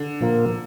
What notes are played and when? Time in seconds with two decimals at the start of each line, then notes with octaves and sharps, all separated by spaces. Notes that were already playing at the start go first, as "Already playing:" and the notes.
Already playing: D3
0.20 A#2 F3 A#3 F4 A#4